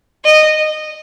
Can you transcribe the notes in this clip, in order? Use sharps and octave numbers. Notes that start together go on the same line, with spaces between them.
D#5